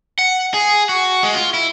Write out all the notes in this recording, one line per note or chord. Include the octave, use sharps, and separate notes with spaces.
F#5
G#4
F#4
G#3
F4
E4